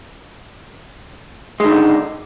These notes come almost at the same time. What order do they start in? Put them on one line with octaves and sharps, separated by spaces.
G#3 D#3 D3